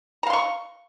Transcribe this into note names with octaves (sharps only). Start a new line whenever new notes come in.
F5 A#5 C6 C#6